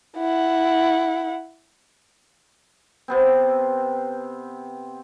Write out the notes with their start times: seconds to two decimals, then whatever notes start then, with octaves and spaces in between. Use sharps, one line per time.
0.17 E4 F#5
3.08 C3 B3 C4